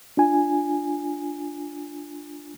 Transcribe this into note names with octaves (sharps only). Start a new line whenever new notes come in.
D4 F4 G#5